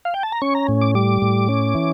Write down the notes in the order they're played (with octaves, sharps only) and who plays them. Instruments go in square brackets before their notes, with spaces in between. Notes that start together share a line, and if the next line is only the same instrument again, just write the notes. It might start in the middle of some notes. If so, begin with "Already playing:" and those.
[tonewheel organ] F5
G5
A5
A#5
C#4 C#6
A#5
A2
D6
G3 D6
A2
C#4
E3